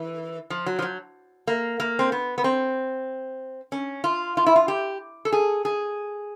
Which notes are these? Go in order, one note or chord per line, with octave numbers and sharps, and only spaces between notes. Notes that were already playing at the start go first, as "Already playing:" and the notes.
Already playing: E3
F3
F#3
F3
F#3
A#3
A#3
C4
B3
B3
C4
C#4
F4
F4
E4
F4
G4
A4
G#4
G#4